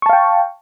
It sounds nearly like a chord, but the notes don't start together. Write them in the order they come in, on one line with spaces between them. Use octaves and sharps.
C#6 A5 F5 G5